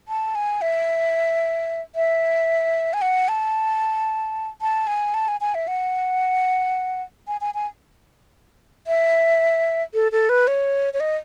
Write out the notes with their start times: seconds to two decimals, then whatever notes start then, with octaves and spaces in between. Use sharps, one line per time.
0.08 A5
0.35 G#5
0.62 E5
1.95 E5
2.93 G#5
3.02 F#5
3.28 A5
4.61 A5
4.87 G#5
5.14 A5
5.28 G#5
5.41 G#5
5.55 E5
5.68 F#5
7.28 G#5
7.41 G#5
7.54 G#5
8.87 E5
9.94 A4
10.12 A4
10.29 B4
10.47 C#5
10.94 C#5
11.00 D#5